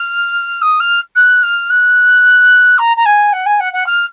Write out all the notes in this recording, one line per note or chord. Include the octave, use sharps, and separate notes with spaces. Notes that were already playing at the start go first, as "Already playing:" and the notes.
Already playing: F6
D#6
F6
F#6
F6
F#6
A#5
A#5
G#5
F#5
G#5
F#5
F#5
F6